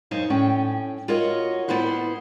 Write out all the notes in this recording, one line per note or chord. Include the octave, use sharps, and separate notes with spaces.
F#2 D#4 C5 C#5 F5
A2 C#4 G5
F4 F#4 A#4 C#5 D#5 F#5
A2 B3 E4 B4 C5 F#5